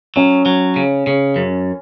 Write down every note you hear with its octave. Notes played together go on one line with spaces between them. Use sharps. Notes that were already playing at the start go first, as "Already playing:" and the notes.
F#3 C#4
F#3
C#3
C#3
F#2